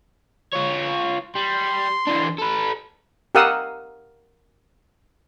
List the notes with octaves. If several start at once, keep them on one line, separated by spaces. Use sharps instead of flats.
F4 C#5
G3 C6
E3 D4
A4 B4
G4 A#4 F5 F#5 D#6 E6